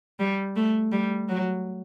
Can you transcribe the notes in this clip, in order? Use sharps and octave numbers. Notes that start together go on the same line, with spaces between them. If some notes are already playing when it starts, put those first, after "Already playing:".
G3
A3
G3
F#3